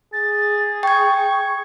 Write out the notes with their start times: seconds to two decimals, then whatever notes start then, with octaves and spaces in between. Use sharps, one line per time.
0.13 G#4 A6
0.83 G5 C#6 G#6